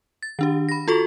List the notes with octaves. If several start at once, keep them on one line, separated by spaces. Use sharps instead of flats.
A6
D#3 D4 G4
B5 A#6
F4 F#4 A4 C#6